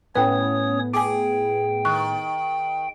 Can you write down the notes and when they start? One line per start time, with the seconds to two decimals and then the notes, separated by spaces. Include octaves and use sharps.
0.15 A2 B3 C#4 B4 C#5 G5 D#6
0.94 G#4 G5 G#5 D6
1.85 D#3 C#6 F#6